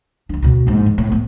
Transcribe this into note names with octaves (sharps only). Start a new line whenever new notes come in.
D2 D4
D2 B2
A#1 G#2
E2
A2
A3 B3